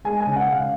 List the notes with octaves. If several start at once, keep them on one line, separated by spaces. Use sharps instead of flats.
G#3 G#5
G#5
C#3
F#5
G#3 F5